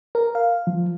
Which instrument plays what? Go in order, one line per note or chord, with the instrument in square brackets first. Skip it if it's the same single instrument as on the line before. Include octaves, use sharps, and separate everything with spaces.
[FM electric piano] A#4
F5
[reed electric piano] F3